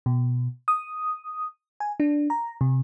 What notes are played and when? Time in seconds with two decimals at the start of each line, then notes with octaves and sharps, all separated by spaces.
0.06 B2
0.68 D#6
1.80 G#5
2.00 D4
2.30 A#5
2.61 C3